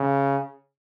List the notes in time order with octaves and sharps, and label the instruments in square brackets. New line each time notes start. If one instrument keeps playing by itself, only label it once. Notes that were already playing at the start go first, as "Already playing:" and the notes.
Already playing: [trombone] C#3